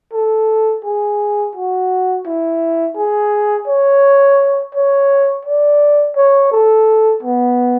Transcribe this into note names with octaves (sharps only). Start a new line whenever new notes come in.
A4
G#4
F#4
E4
G#4
C#5
C#5
D5
C#5
A4
B3